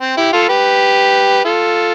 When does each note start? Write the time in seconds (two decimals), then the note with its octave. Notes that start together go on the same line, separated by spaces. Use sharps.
0.01 C4
0.17 E4 G4
0.33 F4 A4
0.49 G4 B4
1.44 F4 A4